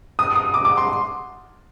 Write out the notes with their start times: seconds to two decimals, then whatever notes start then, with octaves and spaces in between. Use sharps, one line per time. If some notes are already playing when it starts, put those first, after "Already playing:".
0.19 D#6
0.35 D#6
0.54 D6
0.65 D6
0.77 C6